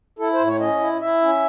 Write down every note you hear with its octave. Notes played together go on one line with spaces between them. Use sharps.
E4 A4
C5
A2
C#5
C#4 D#5
E4
E4 E5
C#4